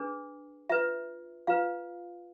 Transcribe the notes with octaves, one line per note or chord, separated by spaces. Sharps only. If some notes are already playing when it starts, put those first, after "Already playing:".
Already playing: D4 G#4 B4
F4 B4 E5
F4 B4 F5